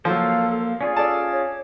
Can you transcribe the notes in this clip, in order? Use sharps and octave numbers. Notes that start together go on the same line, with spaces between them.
F3 F#3 A#3 A4 C5
C#4 F4 G#4 D5
A4 D5 A5
C#5